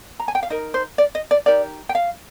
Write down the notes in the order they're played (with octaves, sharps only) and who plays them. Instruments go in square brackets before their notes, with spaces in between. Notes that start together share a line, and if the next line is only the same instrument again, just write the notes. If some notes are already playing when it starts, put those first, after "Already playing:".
[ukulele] A#5
G#5
G5
F5
D#4 A#4 D#5
C5
D5
D#5
D5
D#4 G4 A#4 D5
G5
F5